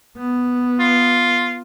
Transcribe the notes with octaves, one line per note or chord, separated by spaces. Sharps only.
B3
F4